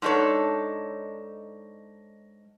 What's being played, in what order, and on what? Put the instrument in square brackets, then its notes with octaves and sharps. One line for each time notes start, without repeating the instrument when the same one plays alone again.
[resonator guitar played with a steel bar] G#2 D4 D#4 A4 C#5